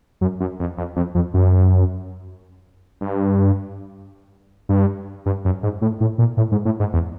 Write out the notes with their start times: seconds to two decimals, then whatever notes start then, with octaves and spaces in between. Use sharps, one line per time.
0.21 F#2
0.40 F#2
0.59 F2
0.77 F2
0.96 F2
1.15 F2
1.34 F#2
3.01 G2
4.69 G2
5.26 G2
5.45 F#2
5.63 G#2
5.82 A2
6.01 A2
6.18 A#2
6.37 A2
6.52 G#2
6.65 A2
6.80 G#2
6.93 E2